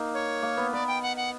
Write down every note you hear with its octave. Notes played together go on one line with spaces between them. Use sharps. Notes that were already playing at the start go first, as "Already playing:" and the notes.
Already playing: A#3 D#4
C#5
A#3
B3
B3 D5
G5
F#5
F#5